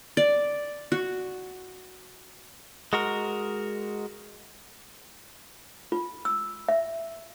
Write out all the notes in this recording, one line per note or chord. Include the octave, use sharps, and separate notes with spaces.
D5
F#4
G#3 F#4 A#4
F4
E6
E5